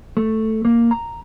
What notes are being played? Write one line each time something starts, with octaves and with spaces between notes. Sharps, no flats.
A3
A#3
A#5